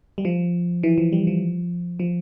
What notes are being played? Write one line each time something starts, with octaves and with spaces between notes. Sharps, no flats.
G3
F3
E3
F3
G3
F3
F3